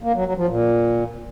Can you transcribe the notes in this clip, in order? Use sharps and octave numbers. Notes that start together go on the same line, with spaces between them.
A#3
F#3
F#3
F3
A#2